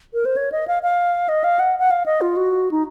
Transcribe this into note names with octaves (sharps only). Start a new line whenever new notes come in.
A#4
C5
C#5
D#5
F5
F5
D#5
F5
F#5
F#5
F5
D#5
F4
F#4
D#4